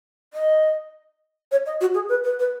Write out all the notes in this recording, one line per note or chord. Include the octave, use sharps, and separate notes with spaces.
D#5
C#5
D#5
F#4
G#4
B4
B4
B4